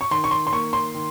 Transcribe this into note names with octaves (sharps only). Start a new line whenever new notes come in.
C#6
D#3 C6
C#6
C6
C6
A#3 C#6
C6
D#3